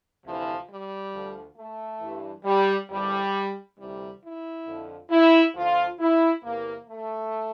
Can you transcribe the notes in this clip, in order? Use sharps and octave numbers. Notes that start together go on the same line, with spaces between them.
D2 C3 E3 F3
G3
D2 D3 F3
A3
G2 E3
G3
E2 D3 F3 G3
D2 C3 E3 G3
E4
F2 D3 F3
E4
D2 D3 F3 F4
E4
E2 C3 E3 A#3
A3